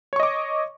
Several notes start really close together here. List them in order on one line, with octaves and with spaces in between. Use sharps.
C#5 C#6 D#5 D6